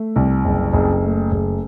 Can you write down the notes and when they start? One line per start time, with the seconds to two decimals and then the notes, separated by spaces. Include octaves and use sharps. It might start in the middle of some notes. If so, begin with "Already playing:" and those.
Already playing: A3
0.16 C2
0.45 F#1
0.73 F#1
1.03 A3
1.32 F#1